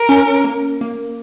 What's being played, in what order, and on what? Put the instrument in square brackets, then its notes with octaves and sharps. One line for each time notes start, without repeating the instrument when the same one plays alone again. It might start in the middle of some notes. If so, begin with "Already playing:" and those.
Already playing: [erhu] A#4
[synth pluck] C#4
A#3
A#3